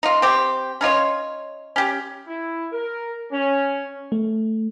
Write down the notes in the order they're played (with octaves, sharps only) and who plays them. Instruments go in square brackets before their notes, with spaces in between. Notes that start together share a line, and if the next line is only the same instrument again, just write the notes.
[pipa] D#4 F4
C4 G4
C#4 D#4 F4 C#5
C#4 G4
[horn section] E4
A#4
C#4
[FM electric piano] A3